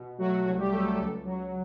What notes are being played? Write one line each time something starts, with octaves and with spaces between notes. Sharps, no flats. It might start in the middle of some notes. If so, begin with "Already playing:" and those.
Already playing: B2
F#3 A3 F#4
C2 F#3 F#4
G3 G4
F#3 A3 A4
A3 A4
C#2
F#3